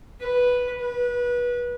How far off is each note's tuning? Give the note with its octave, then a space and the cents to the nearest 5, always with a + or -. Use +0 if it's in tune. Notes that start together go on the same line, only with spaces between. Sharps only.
B4 -5
B4 -25